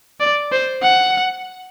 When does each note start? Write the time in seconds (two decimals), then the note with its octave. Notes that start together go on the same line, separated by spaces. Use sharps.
0.20 D5
0.52 C5
0.83 F#5